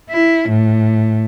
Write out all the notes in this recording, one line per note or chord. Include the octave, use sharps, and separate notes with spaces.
E4
A2